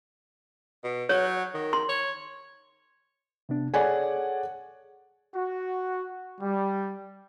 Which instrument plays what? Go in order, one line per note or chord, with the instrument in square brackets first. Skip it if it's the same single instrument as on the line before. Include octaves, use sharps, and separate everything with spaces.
[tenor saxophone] B2
[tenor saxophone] F#3 [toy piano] C#5
[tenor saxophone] D#3
[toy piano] C6
[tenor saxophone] C#5
[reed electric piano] C3 B3 D4
[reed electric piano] G#4 A4 C#5 [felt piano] D5 F#5 G#5
[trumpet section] F#4
G3